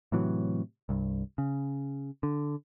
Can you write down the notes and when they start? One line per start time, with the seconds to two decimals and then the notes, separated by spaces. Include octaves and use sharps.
0.12 A2 C3 E3 F#3
0.89 C2 G2
1.38 C#3
2.23 D3